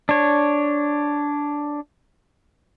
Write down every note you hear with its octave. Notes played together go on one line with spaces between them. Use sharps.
D4 C#5